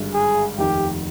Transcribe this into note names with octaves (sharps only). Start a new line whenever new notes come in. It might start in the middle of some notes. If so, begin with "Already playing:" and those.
Already playing: G#1 G2 D3 G#3
G#4
F1 D#2 D#3 G4